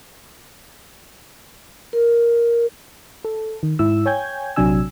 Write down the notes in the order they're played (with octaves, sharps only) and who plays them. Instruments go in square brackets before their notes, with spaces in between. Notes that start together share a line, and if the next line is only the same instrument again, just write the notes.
[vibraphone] A#4
[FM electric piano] A4
D#3
G#2 E4 E6
C#5 G5 G#5 G6 G#6
A#1 C3 F#3 D4 G#5 E6